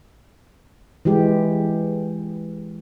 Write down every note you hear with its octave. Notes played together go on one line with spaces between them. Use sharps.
E3 G#3 G4